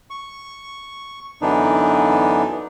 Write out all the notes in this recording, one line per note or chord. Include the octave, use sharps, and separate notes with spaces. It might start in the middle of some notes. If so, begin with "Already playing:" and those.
C#6
F#2 D3 E3 B3 D4 D#4